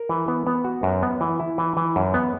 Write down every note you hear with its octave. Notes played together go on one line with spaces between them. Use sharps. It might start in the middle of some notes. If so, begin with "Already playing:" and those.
Already playing: A#4
E3
B3
B3
F#4
F#2
B3
E3
E4
E3
E3
F#2
B3